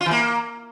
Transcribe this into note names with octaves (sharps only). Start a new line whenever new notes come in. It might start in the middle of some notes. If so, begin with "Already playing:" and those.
F4
E3
A#3